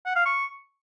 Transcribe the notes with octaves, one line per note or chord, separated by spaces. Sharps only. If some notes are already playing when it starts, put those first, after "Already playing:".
F#5
F5
C#6